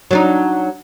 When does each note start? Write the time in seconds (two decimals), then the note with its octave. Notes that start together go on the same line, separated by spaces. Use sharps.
0.11 F#3 D4 D#4